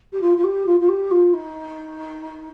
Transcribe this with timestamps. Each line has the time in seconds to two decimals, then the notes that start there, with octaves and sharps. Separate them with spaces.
0.12 G4
0.21 F4
0.37 F4
0.44 G4
0.66 F4
0.80 F4
0.88 G4
1.11 F4
1.33 D#4